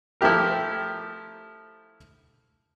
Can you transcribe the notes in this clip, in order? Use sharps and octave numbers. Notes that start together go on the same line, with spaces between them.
F3 A3 E4 G4 A#4